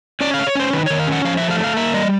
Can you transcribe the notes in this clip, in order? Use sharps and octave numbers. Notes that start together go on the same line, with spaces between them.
C#4 D5
A3 F5
C#5
C#4 C5
D#3 B4
D#3 C#5
F5
C#4 F#5
F3 F5
A3 E5
F5
D4
F5
A#3 E5
G3 D#5